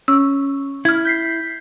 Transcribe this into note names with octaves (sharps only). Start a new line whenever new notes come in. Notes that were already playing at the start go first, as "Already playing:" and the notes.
C#4 E6
E4 F6 G#6
G6 B6 C7